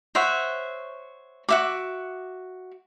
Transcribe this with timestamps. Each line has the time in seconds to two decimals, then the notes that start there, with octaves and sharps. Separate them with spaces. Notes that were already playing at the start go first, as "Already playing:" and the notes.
0.15 C5 C#5 E5 F#5
1.49 F#4 E5 D6